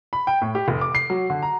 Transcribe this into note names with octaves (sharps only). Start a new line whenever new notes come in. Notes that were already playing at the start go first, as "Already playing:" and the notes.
B5
G5
A2
G4
F1
D6
C7
F#3
D3
A#5